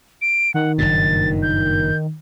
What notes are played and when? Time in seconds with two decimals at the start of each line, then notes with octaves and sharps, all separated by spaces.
0.21 D7
0.54 D#3 F#5
0.78 F#1 G2 A#2 A6
1.42 G6